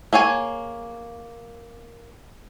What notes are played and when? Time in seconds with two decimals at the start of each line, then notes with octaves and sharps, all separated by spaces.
0.13 A#3 G#4 C#5 G#5